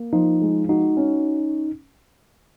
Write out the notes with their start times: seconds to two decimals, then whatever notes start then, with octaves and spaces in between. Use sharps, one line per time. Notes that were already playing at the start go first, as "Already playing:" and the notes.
Already playing: A#3
0.13 F3 D#4
0.41 G#3
0.69 D#4 F#4
0.97 C#4